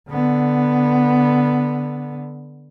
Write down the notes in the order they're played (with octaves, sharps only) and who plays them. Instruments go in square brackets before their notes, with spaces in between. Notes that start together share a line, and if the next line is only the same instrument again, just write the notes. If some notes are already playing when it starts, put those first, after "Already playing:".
[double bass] D3 B3